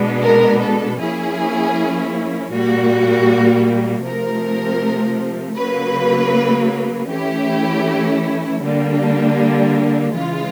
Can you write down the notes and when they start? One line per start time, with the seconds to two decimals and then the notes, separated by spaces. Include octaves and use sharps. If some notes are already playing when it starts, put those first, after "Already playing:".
Already playing: B2 G#3 B3 D4
0.23 A#4
0.61 A4
0.98 F3 A#3 C#4 E4 G#4
2.52 A#2 G3 A#3 F#4
4.04 C3 F3 A3 A#4
5.56 C#3 F#3 A#3 B4
7.08 E3 A3 C#4 E4 G4
8.61 D3 G3 A#3 D4
10.14 C#3 E3 G#3 F4